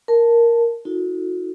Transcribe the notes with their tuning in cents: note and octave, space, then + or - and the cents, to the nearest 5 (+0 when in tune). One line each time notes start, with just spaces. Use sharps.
A#4 +0 A5 +0
D#4 +35 F#4 -35 A4 +0